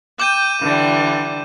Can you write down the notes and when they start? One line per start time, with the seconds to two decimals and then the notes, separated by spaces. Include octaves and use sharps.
0.20 G5 D6 G6 D#7
0.61 D3 E3 G3